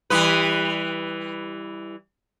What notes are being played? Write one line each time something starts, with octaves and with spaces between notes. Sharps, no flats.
E3 G3 B4